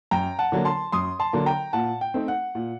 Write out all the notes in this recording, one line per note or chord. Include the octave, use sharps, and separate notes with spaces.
F#2 G5 A#5
F#5 A5
D3 F#3 A#3
A5 C6
F#2 C6 D#6
A5 C6
D3 F#3 A#3
G5 A#5
A#2 F#5 A5
G5
A3 C4 D#4
F#5
A#2